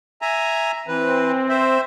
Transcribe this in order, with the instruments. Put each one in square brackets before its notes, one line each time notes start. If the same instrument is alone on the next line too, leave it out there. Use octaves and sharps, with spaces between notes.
[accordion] E5 G#5 A#5
[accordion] E3 B4 [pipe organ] C4
[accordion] C5 E5